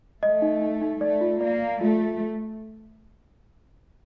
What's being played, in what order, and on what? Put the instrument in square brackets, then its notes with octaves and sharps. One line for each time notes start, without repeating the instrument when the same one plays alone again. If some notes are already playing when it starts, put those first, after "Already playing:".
[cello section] A3 [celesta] D#5
[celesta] D#4
D#4
D#4
[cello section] A3 [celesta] D5
[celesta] F4
[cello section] A#3 [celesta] D5
[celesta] D5
[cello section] A3 [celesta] F4